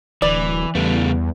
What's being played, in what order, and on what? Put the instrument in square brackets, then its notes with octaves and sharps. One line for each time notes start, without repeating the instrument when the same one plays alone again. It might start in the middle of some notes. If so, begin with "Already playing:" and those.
[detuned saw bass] D1 [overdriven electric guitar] E3 [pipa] D5
[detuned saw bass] E2 [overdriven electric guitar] C#3 A3 [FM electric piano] G3 B3